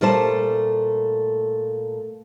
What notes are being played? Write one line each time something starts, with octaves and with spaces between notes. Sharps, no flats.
A#2 G3 A3 C5 A5